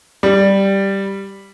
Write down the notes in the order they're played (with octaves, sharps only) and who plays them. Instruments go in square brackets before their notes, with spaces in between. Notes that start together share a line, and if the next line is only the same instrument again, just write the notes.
[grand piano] G3